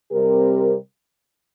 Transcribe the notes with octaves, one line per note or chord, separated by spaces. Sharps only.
C3 G3 C4 G4 A#4